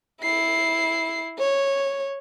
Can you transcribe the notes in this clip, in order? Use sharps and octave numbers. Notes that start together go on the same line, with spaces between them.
E4 C7
C#5